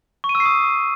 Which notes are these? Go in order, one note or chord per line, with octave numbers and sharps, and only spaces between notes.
C#6
D#7
E6
C7
D#6